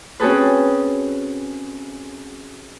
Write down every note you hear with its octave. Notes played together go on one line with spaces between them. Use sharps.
C4 C#4 F#4 G#4 A4 B4